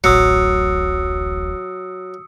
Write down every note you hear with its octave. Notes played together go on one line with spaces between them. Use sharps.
D1 A1 F#3 D#6 E6 C#7